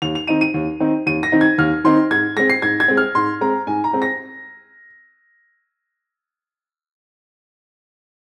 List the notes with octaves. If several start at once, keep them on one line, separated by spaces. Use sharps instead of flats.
D#2 F7
F7
D#3 C4 D#4 D#7
D#7
D#2
D#3 C4 D#4
D#2 D#7
A#6
D#3 C4 D#4
G#6
D#2 F6
D#3 C4 D#4 C6
G#2 G#6
G#3 C4 A#6
C7
G#2 G#6
G#6
G#3 C4
F6
G#2 C6
G#3 C4 A#5
G#2 G#5
A#5
G#3 C4
A#6